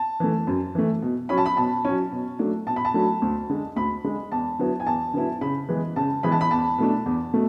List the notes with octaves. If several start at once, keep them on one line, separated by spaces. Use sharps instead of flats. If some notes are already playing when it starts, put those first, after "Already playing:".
Already playing: A5
E3 A3
F#2
E3 A3
B2
F#3 C#4 B5
A5
B5
B2 A5
F#3 C#4
B2
F#3 A3 D4
B2 A5
B5
A5
F#3 A3 D4
D2
D3 G#3
D2 B5
D3 G#3
E2 A5
D3 F#3 B3 E4
G#5
E2 A5
D3 F#3 B3 E4
C#3 B5
E3 G#3 B3
C#3 A5
E3 G#3 B3 B5
A5
B5
E2 A5
B2 A3 D4
E2
B2 A3